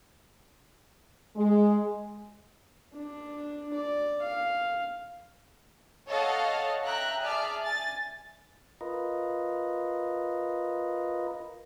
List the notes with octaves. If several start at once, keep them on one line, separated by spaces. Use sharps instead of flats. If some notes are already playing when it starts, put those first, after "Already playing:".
G#3
D4
D5
F5
A4 C#5 D#5 F5 F#5
E5 G5 A#5 F#6
G#4 D5 E5 A5 F6
G#5 A6
F4 A#4 B4 D#5